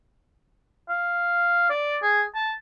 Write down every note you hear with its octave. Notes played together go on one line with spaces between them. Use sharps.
F5
D5
G#4
A5